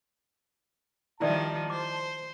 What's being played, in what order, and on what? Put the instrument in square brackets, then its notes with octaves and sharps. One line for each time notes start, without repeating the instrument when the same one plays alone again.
[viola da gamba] D#3 F3 G3 [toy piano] E4 D5 E5 [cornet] A5
[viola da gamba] C5 [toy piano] D6